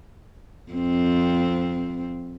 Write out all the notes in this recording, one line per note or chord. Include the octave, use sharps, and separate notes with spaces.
F2 C4